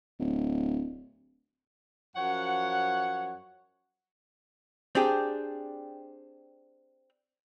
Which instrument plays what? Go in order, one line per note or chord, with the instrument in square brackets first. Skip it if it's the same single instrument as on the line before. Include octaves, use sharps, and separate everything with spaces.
[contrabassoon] D1
[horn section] F#2 F3 C#5 F#5
[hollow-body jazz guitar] C4 D4 G4 G#4